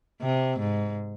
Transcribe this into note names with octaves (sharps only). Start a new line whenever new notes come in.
C3
G#2